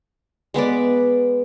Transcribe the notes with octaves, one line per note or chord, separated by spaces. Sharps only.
G#3 B3 B4 D5